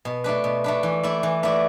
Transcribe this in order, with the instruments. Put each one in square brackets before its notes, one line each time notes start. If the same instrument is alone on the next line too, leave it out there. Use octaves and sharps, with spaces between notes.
[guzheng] B2
A3 D4 B4
B2
A3 D4 B4
E3
A3 E4 D5
E3
A3 E4 D5